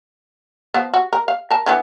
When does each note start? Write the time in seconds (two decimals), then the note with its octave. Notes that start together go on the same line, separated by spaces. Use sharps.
0.74 F3 B3
0.94 F#4
1.13 A#4
1.28 F5
1.50 A#4 A5
1.66 D3 E3 B3